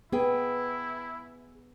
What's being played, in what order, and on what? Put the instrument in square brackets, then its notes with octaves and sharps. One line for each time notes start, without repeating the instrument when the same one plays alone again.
[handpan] B3 [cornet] E4 [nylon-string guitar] G#4 B4 G5